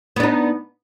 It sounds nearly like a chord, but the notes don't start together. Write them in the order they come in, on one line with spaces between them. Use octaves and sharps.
B3 D4 D#4